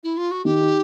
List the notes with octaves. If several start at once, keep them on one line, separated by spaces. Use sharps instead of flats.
E4
F4
F#4
D#3 G4
D#4